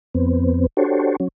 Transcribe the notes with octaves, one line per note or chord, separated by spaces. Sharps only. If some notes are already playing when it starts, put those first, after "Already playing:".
F2 B3 C4
D4 F#4 G4 A4 C5 C#5
F#3 C#4